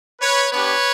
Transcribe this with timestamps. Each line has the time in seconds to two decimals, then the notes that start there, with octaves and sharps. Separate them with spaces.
0.21 B4 C#5
0.51 B3 D4 G4 B4 C#5